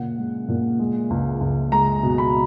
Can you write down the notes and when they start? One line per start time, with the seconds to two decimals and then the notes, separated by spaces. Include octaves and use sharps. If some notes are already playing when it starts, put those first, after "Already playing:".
Already playing: A#2 C#3 F#5
0.19 G#3
0.48 A#2
0.79 G#3
1.10 C#2
1.41 C#2
1.72 G#3 A#5
2.03 B2
2.18 B5